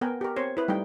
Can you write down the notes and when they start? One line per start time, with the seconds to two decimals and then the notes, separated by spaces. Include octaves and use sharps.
0.01 B3 A#4 G5 G#5
0.21 G4 A#4
0.36 C4 C5 C#5
0.57 E4 B4
0.68 G3 A3 D#4 G5